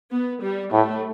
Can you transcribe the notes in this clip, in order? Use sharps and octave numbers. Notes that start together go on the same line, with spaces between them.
B3
G3
A2 A3